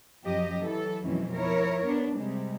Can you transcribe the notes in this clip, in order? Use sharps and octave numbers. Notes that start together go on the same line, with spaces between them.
F#2 F3 G4 D#5
E3 F#3 A4
F2 B2 E3 F#3 G#3 C#4
F3 E4 A#4 C#5
B3 D4
C3 G3 G#3